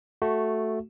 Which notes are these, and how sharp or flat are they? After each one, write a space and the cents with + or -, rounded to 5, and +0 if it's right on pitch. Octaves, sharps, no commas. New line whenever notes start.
A3 +0 F#4 +0